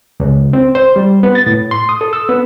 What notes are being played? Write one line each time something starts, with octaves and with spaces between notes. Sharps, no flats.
C#2
C4
C5
G3
B3
A6
A2
C6
D#6
A4
E6
B3